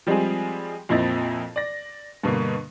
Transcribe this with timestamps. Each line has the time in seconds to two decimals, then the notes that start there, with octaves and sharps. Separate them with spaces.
0.07 F3 G3 G#3 C4 G4 G#4
0.89 F2 A#2 C4 E4 D#5 A6
1.56 D5 A#6
2.23 G2 B2 D3 A#3